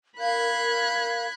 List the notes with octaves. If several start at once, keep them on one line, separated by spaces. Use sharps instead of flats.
A#4 F5 B5 F#6 G#6